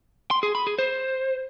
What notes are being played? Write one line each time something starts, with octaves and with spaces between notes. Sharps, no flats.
C6
G#4
B5
G#4
C5